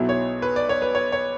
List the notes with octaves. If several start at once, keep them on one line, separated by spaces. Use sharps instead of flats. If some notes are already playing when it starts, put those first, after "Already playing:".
Already playing: B1 B2 F#3 E4
C#5
B4
D5
C#5
B4
C#5
C#5